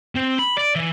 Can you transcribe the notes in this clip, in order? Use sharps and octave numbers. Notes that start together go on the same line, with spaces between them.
C4
B5
D5
E3